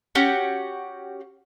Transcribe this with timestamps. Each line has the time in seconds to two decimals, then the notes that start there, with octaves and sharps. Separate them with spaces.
0.15 C#4 F#4 G4 F#5